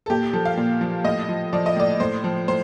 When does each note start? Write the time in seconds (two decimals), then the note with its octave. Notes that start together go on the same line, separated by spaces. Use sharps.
0.06 A4
0.10 A#2 G4
0.33 F3 A4
0.45 F5
0.57 A#2
0.81 F3
1.05 A2 D#5
1.29 F3
1.53 F3 D5
1.66 D#5
1.76 A2 D5
2.00 A2 C5
2.24 F3
2.48 A2 C5